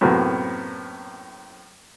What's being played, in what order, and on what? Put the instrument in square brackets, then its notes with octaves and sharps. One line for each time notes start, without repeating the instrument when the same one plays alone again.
[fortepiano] F#2 A2 C3 A#3 B3